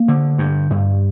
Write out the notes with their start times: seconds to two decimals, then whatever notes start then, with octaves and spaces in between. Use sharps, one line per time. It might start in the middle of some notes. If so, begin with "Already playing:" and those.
Already playing: A#3
0.08 D3
0.38 G2
0.70 G2